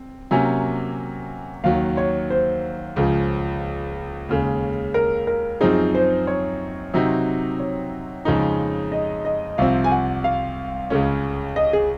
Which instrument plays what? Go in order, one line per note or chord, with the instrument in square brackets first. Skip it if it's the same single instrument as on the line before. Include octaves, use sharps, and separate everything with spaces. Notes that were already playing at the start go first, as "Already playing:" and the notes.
Already playing: [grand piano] C4
[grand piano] C3 F#3 A#3 C#4 [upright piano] G#5
[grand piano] D#2 D#3 F#3 [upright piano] F5
[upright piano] C#5
C5
[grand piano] C#2 C#3 F3
D#2 C#3 G#3
[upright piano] A#4
A#4
[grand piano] F#2 F3 C4 D#4 [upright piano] G#4
[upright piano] C5
C#5
[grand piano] C3 F#3 C4 D#4
[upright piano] C#5
[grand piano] F2 C#3 F3 G#3 D#4
[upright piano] D#5
D#5
[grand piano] C2 C3 F3 C4 [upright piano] F5
[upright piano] G#5
F#5
F5
[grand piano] C#2 C#3 G#3 C#4
[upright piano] D#5
G#4